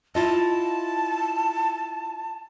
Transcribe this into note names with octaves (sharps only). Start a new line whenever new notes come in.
E4 F4 D#5 A5